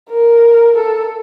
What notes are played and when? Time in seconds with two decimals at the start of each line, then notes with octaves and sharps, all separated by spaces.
0.10 A#4
0.76 A4